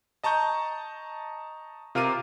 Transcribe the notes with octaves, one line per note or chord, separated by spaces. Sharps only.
D#5 A5 A#5 C#6 G6
C3 F4 A#4 F5 D6 D#7